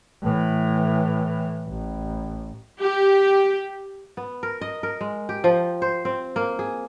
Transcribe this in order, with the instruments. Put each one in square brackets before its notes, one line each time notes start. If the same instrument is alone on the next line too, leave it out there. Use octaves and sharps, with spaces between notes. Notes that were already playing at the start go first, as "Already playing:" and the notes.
[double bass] A2 E3
A1
[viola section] G4
[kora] B3
A#4
D#5
A#4
G#3
G4
F3
C5
C4
A#3
G#4